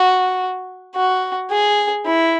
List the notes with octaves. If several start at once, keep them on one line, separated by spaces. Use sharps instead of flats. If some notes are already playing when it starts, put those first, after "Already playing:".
Already playing: F#4
F#4
G#4
E4